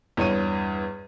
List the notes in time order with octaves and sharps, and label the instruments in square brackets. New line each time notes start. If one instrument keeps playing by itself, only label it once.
[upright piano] E2 G2 C#5 C#6 D#7